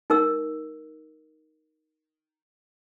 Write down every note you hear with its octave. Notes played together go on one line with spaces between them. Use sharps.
D#4 A#4 E6